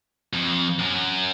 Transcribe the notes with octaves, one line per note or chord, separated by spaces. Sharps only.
F2
F#2